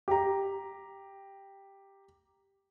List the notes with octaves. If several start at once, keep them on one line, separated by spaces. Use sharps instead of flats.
G4 A#5